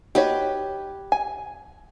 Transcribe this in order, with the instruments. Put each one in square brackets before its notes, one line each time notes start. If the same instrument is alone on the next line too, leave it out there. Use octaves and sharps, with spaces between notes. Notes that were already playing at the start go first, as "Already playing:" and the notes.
[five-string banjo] D#4 F#4 C#5 [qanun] G4 B4
[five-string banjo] G#5